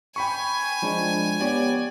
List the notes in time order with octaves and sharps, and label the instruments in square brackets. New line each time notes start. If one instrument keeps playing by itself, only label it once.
[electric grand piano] G5 B5 C#6 [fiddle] G#5
[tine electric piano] F3 G#3 D4
[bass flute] B3 [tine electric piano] G4 C#5 [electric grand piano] D5